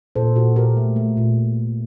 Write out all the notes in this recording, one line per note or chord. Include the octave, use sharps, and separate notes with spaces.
A#2 A4 C5
A#2 F#4 A4
A#2 G4 A#4
A3
A3
A#2